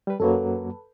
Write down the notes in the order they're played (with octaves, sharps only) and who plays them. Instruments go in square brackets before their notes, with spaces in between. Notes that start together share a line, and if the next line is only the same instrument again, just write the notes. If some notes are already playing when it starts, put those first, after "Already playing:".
[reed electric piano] G3 B4
[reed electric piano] F#2 F#3 A#3 [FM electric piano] A4 B4